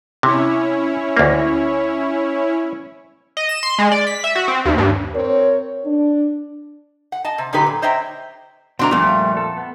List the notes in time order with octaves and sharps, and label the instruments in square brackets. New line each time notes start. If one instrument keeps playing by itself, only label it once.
[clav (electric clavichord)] C3 [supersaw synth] C#4 E4 C#5
[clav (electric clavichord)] D2 A#3
[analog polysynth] D#5
E7
C6
G#3
D5
B6
E5
F#4
C4
D#2
G2
[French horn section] C4 A#4 C#5
D4
[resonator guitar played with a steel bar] F#5
D#5 A5
C3
A#2 D3 F#3 D#4 G4 B4
A#2
C5 C#5 D#5 E5 G5 A#5
[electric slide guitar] B2 A3 [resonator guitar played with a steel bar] C4 D4 A#5
[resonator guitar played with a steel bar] F2 A#2 [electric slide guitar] G3 A3
[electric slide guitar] A4
B3